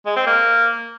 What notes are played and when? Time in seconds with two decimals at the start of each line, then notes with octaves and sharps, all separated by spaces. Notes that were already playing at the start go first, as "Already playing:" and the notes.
0.06 G#3
0.16 C4
0.27 A#3